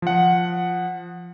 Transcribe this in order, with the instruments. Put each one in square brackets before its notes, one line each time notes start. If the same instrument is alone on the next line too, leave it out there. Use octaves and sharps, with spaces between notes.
[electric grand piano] F3 F#5